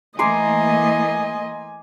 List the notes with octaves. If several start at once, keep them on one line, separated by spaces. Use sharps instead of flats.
E3 A3 A#3 D#5 G#5 A#5 C6 D6